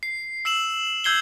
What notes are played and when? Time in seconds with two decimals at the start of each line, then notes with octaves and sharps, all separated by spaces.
0.03 C7
0.45 E6 C7 E7 F#7
1.04 E6 G6 G#6 C7 F#7 G7